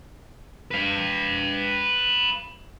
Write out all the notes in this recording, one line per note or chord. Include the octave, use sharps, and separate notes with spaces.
B4 F5